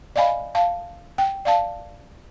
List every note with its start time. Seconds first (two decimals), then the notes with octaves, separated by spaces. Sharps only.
0.16 D5 D#5 F5 G#5 B5
0.55 F5 A5
1.18 G5
1.45 D5 F5 A5